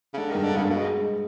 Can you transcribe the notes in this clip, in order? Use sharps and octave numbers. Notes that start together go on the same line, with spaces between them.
C#3
D3 G#3
G2 D#3
D3
G2 C#3
A#2
B2 G#3